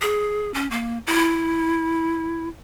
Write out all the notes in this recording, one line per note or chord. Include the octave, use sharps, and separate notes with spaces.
G#4
C#4
A#3
E4